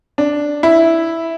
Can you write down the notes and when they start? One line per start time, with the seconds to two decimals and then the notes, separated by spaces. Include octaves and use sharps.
0.18 D4
0.63 E4